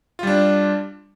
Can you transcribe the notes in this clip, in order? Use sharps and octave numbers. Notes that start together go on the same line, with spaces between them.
G3 D4 F4